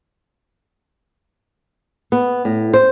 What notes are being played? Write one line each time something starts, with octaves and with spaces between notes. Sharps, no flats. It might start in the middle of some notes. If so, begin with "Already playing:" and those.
B3
A2
C5